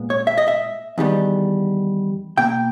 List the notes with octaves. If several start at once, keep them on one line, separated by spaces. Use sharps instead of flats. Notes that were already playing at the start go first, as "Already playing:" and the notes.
Already playing: A#2 G#3 B3
C#5
E5
D#5
E5
E2 D#3 G3 B3
B2 A#3 G5